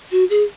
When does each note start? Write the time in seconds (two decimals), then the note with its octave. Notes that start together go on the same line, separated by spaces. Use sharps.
0.12 F#4
0.30 G#4